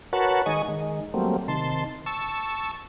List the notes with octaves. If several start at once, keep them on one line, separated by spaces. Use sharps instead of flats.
F#4 A#4 B4 C#5 F#5 A5
D#3 G#3 D#5 G#5 C#6
D#3 G#3
F#3 G3 A3 A#3 C4
C3 D#3 A5 C6
A5 C#6 E6